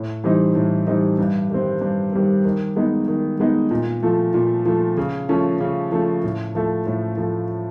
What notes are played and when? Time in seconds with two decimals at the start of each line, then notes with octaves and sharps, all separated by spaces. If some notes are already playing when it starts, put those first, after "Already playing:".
Already playing: A2
0.24 E3 G3 C4 D#4
0.55 A2
0.87 E3 G3 C4 D#4
1.19 G2
1.50 D#3 G3 C4
1.81 G2
2.13 D#3 G3 C4
2.44 D#3
2.76 G#3 B3 D#4
3.08 D#3
3.40 G#3 B3 D#4
3.71 A#2
4.03 F3 A3
4.34 A#2
4.65 F3 A3
4.97 C#3
5.29 F3 A3 C#4
5.60 C#3
5.92 F3 A3 C#4
6.24 A2
6.55 F3 A3
6.87 A2
7.18 F3 A3